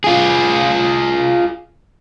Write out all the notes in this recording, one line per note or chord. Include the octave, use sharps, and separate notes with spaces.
F4 G#4